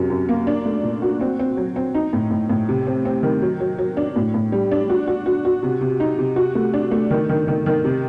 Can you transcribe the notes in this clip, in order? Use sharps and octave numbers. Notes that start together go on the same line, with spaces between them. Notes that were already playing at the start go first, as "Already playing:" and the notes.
Already playing: F#2 C3 F#3
F#2
A#3
D4
A3
A#2
F#4
C4
C4
F#3
C4
D#4
A2
A2
A2
C3
C4
C4
D#3
F#3
F#3
F#3
D4
A2
A2
G3
D4
F#4
F#4
F#4
F#4
C3
C3
D#4
C3
F#4
A3
D4
A3
D#3
D#3
D#3
D#3
C3